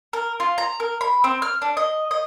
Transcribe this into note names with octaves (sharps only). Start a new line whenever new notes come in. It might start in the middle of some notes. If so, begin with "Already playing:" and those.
A#4
F4
A#5
A#4
B5
C4
F6
D4
D#5
D#5